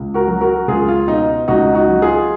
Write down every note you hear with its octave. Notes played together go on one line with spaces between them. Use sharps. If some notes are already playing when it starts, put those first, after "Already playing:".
Already playing: C#2
F#4 A#4
F#3
F#4 A#4
C#2 F4 G#4
F4
B2 D#4
C#2 D#4 F#4
D#4 F#4
F#3
F4 G#4